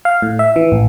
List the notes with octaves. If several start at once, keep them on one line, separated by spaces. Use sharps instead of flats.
F5
A2
E5
E3
A1